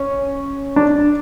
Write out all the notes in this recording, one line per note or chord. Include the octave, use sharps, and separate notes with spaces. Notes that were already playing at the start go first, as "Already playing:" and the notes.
Already playing: C#4
D4